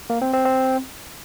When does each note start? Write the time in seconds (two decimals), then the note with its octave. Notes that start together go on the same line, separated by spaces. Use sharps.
0.10 A#3
0.22 C4
0.33 C4
0.45 C4